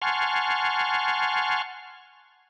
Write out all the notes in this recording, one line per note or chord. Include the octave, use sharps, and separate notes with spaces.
F#5 G#5 A5 C6 C#6 F6